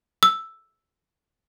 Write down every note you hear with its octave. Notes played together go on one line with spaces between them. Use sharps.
E6